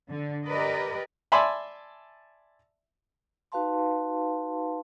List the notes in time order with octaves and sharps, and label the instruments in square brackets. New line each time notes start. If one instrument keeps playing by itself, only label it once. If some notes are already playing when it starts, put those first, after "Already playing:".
[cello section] D3
G4 A#4 B4 D5 D#5
[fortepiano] D5 E5 G#5 A5 B5 C6
[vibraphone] D#4 F#4 B4 F5 A5 C6